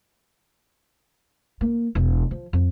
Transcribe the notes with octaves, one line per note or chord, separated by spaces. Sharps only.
A#3
E1
F3
F2